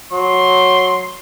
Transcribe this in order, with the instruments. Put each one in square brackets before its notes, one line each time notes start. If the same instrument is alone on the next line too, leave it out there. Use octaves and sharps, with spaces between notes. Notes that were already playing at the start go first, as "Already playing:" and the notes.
[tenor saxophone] F#3 [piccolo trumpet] C6